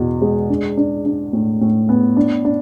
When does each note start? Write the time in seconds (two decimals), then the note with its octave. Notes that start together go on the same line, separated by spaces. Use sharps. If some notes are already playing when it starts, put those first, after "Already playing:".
Already playing: E2 B2
0.22 G#3
0.49 D4
0.77 D4
1.05 D4
1.33 A2
1.61 A2
1.89 B3
2.17 D4
2.45 D4